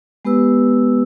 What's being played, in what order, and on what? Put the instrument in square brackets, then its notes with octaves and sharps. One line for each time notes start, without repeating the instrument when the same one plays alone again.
[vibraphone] G#3 B3 G4 B4 E6